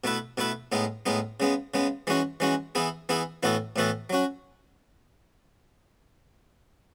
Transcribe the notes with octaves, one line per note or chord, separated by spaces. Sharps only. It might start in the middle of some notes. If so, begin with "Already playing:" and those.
B2 A3 E4 B4
B2 A3 E4 B4
A2 G#3 B3 D#4
A2 G#3 B3 D#4
C#3 G#3 B3
C#3 G#3 B3
E3 G#3 C#4 F#4
E3 G#3 C#4 F#4
E3 B3 E4 G#4
E3 B3 E4 G#4
A2 E3 B3 F#4 A4
A2 E3 B3 F#4 A4
F#3 C#4 F#4